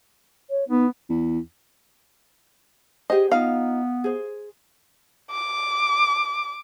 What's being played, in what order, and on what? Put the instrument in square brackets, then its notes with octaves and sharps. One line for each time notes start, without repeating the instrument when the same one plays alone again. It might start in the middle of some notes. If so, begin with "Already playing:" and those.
[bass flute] C#5
[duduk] B3 [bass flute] D#4
[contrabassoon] E2
[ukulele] G4 G#4 C5 [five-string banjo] D#5
[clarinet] B3 [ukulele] D#4 F4 A#4 [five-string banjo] F5
[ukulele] G#4 C5
[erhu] D6